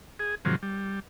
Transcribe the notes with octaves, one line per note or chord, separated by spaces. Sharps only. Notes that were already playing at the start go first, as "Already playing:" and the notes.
G#4
G#2 C3 D#3 F3 F#3
G3